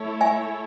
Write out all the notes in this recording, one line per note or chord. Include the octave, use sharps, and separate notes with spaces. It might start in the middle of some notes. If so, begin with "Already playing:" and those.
Already playing: A3 E4 A4 C#5
E5 G#5